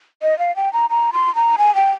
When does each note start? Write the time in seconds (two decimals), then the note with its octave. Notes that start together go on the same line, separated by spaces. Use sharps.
0.22 D#5
0.39 F5
0.56 G5
0.73 A#5
0.90 A#5
1.13 C6
1.35 A#5
1.58 G#5
1.75 G5